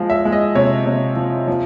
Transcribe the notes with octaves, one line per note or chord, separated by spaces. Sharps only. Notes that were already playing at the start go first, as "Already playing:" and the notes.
Already playing: F3 G#3
E5
G#3
D#5
C3 C#5
C3
F3
F3